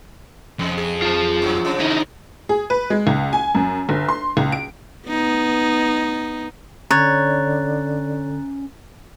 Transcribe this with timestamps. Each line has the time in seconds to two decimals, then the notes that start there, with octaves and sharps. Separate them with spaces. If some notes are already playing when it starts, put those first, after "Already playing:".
0.59 F2 C3 G#3
0.77 G#4
1.02 F4 A5
1.42 F#2 F#3
1.64 C3 F3 D4
1.80 D#3 D#4 E4
2.49 G#4
2.70 B4
2.90 G#3
3.07 C#2
3.33 G#5
3.55 F#2
3.89 G1
4.09 C6
4.37 C#2
4.52 D7
5.08 B3 D#4
6.91 D3 C#4 C#5 A#5 F#6 A6